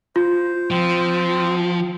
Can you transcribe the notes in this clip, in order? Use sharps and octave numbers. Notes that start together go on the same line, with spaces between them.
F4 C5
F3 C4